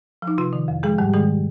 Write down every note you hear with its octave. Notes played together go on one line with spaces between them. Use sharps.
F3
D#4
C3 F4
D#3
F2
F3 G#3 G#4
G#2 G3 G4
D#3 G#3 G#4